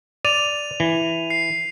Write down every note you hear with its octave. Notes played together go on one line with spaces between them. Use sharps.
D5 D#7 F7
E3
C7